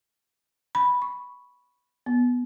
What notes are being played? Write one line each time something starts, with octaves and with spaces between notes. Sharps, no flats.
B5
C#6
B3